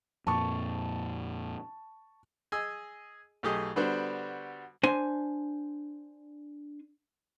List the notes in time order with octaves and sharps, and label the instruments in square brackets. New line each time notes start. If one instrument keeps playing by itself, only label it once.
[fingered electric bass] F2 A#2 A#3 [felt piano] A5 C#6
[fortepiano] G#4 D#5 G#5 E6
B1 A3 G4 G#4 D#5
D3 G3 B3 D4 F#4 C5
[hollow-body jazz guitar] D4 C5 G#5 C6